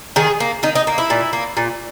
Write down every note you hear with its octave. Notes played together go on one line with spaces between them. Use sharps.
D#3 G#4
A#3
D#3 D#4
D#4
A#3
E4
A#2
A#3
A#2